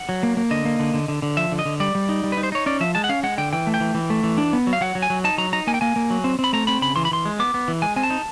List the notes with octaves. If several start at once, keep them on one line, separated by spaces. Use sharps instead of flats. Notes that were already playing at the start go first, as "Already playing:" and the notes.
Already playing: F#5
F#3
A#3
A#3
D3 D#5
A#3
D3
D3
D3
D3
F3 E5
D3
D#5
D3
G3 D5
G3
D#4
G3
B4
D#4
C5
D#4 C#5
C#4 D5
F3 E5
G#3 A5
F#5
C#4 F5
G#3 F#5
D3 G5
E3 G5
A3
G5
E3
E3
A3
E3
D4
B3
F#3
F5
F#3 F#5
F#3
G#5
F#3
D#4 A5
F#3 A#5
D#4 A#5
A#3 G#5
G5
A#3 G#5
A#3
F#3
C4
C4
B5
A3 A#5
C4 B5
C#3 B5
E3 C6
B5
E3 C6
G#3
B3 D6
B3
E3
G#3 G#5
C4 G#5
A5
D#4